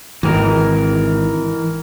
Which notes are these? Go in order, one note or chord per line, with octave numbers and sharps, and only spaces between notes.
G#1 E3 A#4